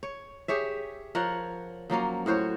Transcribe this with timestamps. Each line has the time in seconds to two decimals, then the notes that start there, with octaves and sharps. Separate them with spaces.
0.03 C#5
0.48 G4 G#4 C#5 E5
1.15 F3 A#4 C#5 F#5
1.90 F3 F#3 A#3 C#4
2.26 A2 F#4 C5 C#5